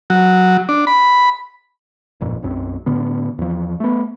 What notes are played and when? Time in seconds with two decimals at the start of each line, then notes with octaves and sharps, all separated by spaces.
0.10 F#3
0.69 D4
0.87 B5
2.21 D1 G1 F2 A#2
2.43 B1 F#2 A3 C4
2.86 A2 D3 B3
3.38 E2 F3
3.80 A3 B3